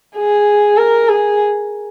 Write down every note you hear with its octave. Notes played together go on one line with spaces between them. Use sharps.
G#4
A#4
G#4